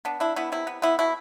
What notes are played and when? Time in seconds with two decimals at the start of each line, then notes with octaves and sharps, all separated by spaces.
0.05 B3 D4
0.20 D4 E4
0.36 B3 E4
0.52 C3 E4
0.67 B3
0.82 B3 E4
0.99 B2 E4